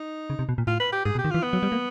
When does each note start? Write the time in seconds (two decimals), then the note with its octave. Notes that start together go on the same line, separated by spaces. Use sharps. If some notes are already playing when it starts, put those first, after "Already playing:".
Already playing: D#4
0.30 C#3
0.39 C3
0.49 B2
0.58 A#2
0.67 A2 F4
0.80 B4
0.92 G4
1.05 G#2 G#4
1.15 B2
1.19 G4
1.25 D#3
1.31 E3 F4
1.43 B3
1.53 F#3
1.63 G3
1.72 A#3